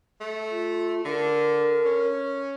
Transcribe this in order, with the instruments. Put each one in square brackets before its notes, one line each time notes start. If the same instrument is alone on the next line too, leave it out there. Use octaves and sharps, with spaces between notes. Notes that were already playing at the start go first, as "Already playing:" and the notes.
[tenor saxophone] A3
[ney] F4
[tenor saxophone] D3 [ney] A#4
[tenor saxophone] C#4